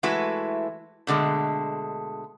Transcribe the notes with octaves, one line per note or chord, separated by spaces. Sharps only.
E3 G#3 A3 E4 F#4 B4
B2 D3 G#3 A3